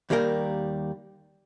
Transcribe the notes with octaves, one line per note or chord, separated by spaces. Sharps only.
D#2 G3 A#3 A#4 G5